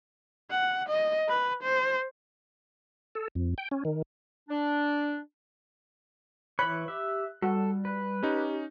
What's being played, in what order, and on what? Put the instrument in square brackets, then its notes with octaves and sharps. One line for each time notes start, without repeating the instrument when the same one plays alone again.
[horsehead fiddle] F#5
D#5
B4
C5
[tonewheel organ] A4
F2
G5
C#4
D#3
[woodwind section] D4
[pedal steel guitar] E3 C#5 [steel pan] B5 [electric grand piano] F#6
[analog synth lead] G4 [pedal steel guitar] E5
[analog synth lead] G3 [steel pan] F#4 [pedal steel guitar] A4
[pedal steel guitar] B4
[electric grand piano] C#4 D#4 [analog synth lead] G4